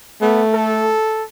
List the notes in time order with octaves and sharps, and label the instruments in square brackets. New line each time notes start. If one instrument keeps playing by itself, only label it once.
[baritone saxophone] A3 [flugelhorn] B3
[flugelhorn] A4